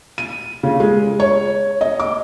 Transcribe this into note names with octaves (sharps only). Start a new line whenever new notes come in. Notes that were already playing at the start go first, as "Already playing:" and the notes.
D#7
C#3
G#3
C#5
D#5
D6